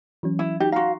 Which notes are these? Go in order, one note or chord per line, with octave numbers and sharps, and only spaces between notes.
E3 F#3 C#4
E4
D#4 F#4 G4 G5
F#4 F5 A#5 C6